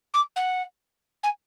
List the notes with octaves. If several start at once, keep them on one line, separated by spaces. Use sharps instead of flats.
D6
F#5
G#5